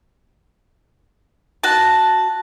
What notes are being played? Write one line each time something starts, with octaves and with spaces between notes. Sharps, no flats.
F#4 A5